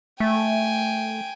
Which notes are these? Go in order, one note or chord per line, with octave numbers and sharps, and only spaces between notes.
A3 G5 G#5